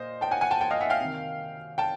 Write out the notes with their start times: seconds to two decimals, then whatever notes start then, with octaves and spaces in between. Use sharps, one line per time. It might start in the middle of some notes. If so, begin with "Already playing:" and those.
Already playing: A#2 C5 D#5
0.21 G5 A5
0.31 F#5 G#5
0.41 F#5 G#5
0.51 G5 A5
0.61 G5 A5
0.71 D#5 F5
0.81 E5 F#5
0.90 F5 G5
1.01 C3 D#3
1.78 G5 A5